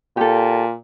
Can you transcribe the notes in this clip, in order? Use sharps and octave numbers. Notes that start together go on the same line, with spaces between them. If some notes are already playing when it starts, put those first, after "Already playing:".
A#2 G4 A4